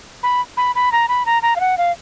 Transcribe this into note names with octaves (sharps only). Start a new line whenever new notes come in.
B5
B5
B5
A#5
B5
A#5
A#5
F5
F#5
F5